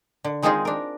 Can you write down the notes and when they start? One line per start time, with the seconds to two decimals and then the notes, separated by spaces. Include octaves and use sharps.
0.24 D3
0.42 D#3 G#3 C4 D#4 F4 G#4
0.65 D4 A#4